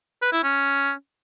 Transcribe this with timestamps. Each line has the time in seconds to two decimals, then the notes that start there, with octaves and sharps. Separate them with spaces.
0.22 B4
0.32 E4
0.43 C#4